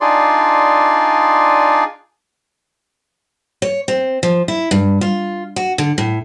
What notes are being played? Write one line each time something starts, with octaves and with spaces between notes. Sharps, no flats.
D4 D#4 F4 G#4 D5 C6
C#5
C4
F3
E4
G2
F4
F#4
D3
A2